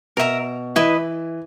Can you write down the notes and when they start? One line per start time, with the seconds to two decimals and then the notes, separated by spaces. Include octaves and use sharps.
0.17 B2 A#4 E5 A#5
0.76 E3 E4 B4 D#5